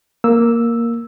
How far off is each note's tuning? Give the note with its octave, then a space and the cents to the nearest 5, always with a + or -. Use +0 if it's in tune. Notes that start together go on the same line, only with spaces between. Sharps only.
A#3 +0 E6 +0